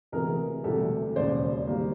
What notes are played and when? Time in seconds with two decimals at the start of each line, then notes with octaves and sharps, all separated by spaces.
0.12 D2 C3 E3 G#3 B3 G#4 A#4
0.64 E1 D2 C3 E3 G3 G4 A4
1.16 E1 D#2 C#3 C5 D5
1.67 D#3 G3 A#3